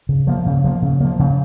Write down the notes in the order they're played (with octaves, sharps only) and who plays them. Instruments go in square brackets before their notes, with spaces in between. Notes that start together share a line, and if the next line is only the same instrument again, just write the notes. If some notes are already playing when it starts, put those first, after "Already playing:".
[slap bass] C#3
F3 A#3
C#3
F3 A#3
C#3
F3 A#3
C#3